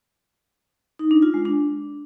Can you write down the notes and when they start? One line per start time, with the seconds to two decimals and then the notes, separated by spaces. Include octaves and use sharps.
0.99 D#4
1.11 D4
1.22 F4
1.34 G#3
1.45 D4